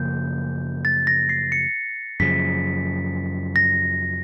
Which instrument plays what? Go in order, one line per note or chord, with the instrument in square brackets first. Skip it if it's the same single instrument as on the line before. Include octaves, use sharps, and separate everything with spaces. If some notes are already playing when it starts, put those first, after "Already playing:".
Already playing: [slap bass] F#2 C#3 F3 A#3 [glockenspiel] G6
[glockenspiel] A6
A#6
C7
C#7
[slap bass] F#2 C#3 F3 [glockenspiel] B6
[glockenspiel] A#6